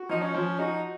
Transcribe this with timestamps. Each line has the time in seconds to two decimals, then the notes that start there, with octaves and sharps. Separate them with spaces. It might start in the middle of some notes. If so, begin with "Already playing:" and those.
Already playing: F#4
0.09 F3 D#4
0.22 C#4
0.35 F3
0.59 D#4 F#4